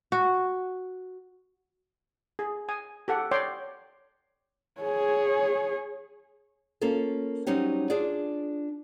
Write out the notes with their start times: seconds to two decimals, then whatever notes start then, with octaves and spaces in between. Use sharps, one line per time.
0.12 F#4
2.39 G#4
2.69 G#5 D#6
3.08 G4 A4 F#5
3.31 C#5 D5 G5 C6
4.81 G#4 C#5
6.81 A#3 C#4 F4 A4 A#4
7.47 F#3 G3 C4 C#4 D#4 G4
7.90 D4 F4 G#4 D5